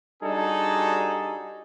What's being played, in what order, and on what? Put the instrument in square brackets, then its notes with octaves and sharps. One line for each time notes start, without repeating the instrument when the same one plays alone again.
[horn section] G3 D4 D#4 F#4 G#4 A4